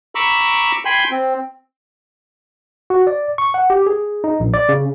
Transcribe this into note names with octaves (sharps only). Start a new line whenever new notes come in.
A#5 B5 C#6 D6 E6
G5 G#5 B5 C6 G6
C4
F#4
D5
C#6
F#5
G4
G#4
D#4
A#1
D5
C#3